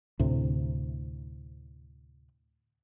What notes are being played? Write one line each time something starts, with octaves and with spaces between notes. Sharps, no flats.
D2 A2 C3